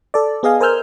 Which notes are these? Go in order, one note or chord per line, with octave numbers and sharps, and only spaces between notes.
A4 D5
B3 G#4 D#5 F5 G#5
A#4 C5 G#5 E6 F6 G6